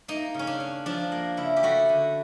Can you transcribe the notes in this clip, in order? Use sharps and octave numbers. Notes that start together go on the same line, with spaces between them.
A#3 D#4
C#3 C#4
D4
C#4
F3 D4
A#3
C#3 E4
G4
A3 F#4
D3